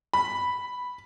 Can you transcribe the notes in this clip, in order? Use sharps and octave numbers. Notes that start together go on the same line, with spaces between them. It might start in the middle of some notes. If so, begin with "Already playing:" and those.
B5